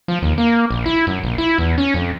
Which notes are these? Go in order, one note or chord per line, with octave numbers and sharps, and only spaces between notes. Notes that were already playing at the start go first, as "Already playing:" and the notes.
F3
D#2
A#3
A#1
E4
F#2
A#1
E4
E2
C#4
F2